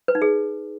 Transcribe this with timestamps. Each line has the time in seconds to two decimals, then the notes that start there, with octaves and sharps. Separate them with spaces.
0.08 B4
0.15 D#4
0.22 G#4